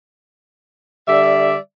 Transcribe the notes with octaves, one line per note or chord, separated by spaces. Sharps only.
D3 G3 D5 E5